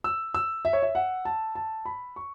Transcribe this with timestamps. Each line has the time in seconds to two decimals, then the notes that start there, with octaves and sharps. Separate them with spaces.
0.04 E6
0.34 E6
0.65 E5
0.73 C#5
0.83 E5
0.95 F#5
1.25 A5
1.55 A5
1.86 B5
2.16 C#6